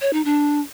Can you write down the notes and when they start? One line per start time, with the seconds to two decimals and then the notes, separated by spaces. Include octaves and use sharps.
0.01 C#5
0.13 D#4
0.25 D4